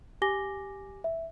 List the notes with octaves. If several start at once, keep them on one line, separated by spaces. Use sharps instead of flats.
G4 G#5 D6 A#6 G7
E5